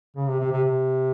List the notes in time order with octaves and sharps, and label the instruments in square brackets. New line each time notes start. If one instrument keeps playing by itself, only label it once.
[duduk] C#3
C3
C3
C3
C3